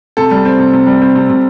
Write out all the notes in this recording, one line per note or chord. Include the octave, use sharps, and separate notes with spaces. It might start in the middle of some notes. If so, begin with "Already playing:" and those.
C3 A4
G3
C4
C3
C3
G3
C4
C3
C3